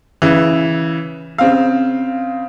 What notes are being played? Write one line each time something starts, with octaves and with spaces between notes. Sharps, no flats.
C#3 E3
C#3 C4 F5